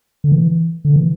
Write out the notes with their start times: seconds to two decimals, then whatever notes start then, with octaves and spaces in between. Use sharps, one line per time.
0.24 D3
0.32 E3
0.85 D3
0.96 E3